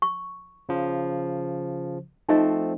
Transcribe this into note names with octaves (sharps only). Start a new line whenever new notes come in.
C#6
C#3 F3
F3 A3 C4 D#4 D#5